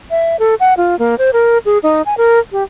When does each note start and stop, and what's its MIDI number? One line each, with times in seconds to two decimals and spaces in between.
0.11 0.36 76
0.39 0.55 69
0.60 0.74 78
0.77 0.98 65
0.99 1.18 58
1.18 1.31 72
1.33 1.58 70
1.66 1.78 68
1.83 2.02 63
2.06 2.17 80
2.18 2.39 70
2.52 2.63 67